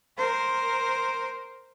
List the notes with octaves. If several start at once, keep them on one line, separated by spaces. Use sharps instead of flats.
A#4 C5